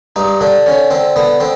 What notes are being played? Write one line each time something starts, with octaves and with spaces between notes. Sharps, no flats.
G2 D#4
D3 D4
D3 C#4
D3 C4
D3 B3
D3 C4